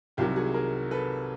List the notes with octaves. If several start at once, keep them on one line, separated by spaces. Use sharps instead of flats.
C2 C3 D#3 F#3 F4 G4
F#4 G#4
G#4 A#4
A4 B4